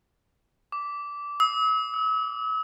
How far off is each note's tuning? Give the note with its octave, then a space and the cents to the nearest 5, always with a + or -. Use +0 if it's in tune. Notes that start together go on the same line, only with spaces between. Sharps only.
D6 -15
E6 -45
E6 +5